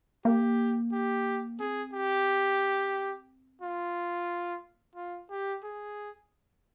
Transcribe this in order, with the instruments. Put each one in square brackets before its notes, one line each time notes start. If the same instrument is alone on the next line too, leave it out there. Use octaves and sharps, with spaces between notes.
[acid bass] A#3 [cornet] G4
[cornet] G4
[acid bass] C4 [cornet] G#4
[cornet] G4
[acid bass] A#3 [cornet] F4
[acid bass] G#3 [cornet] F4
[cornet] G4
G#4